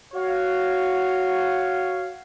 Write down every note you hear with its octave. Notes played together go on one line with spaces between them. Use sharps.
F#4 C#5 F5